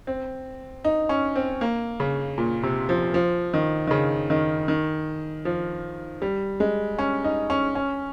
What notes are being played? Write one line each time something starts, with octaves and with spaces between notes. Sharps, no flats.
C4
D#4
C#4
C4
A#3
C#3
A#2
C3
F3
F3
D#3
D#3
C#3
D#3
D#3
F3
G3
G#3
C#4
D#4
C#4
C#4